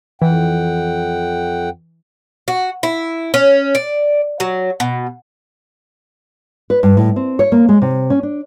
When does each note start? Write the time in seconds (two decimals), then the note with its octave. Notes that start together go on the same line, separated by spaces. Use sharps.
0.22 F2 E3 F#5 G5
2.48 F#4
2.83 E4
3.34 C#4
3.75 D5
4.40 F#3
4.80 B2
6.70 B4
6.83 G2
6.97 A2
7.16 C4
7.39 C#5
7.52 A#3
7.69 G#3
7.82 C3
8.10 C#4
8.23 D4